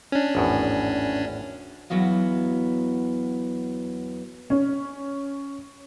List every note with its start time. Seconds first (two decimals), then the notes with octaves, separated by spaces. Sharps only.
0.12 C#4 D4
0.35 G#1 E2 A2
1.90 E2 F#3 B3 D#5 F5
4.50 C#4